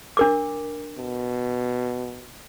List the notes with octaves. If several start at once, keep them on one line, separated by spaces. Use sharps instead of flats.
D4 A#4 D6
B2